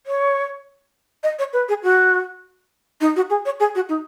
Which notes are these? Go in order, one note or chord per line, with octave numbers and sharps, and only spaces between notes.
C#5
D#5
C#5
B4
G#4
F#4
D#4
F#4
G#4
C#5
G#4
F#4
D#4